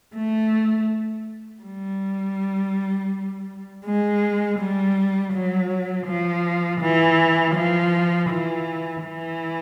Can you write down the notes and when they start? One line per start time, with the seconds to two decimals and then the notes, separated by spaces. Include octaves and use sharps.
0.16 A3
1.63 G3
3.86 G#3
4.59 G3
5.34 F#3
6.07 F3
6.81 E3
7.55 F3
8.30 E3
9.03 E3